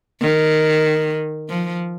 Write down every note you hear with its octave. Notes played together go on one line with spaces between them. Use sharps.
D#3
F3